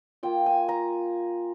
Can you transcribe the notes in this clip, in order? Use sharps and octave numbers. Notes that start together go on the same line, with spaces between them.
A#3 F4 G5
G#5
A#5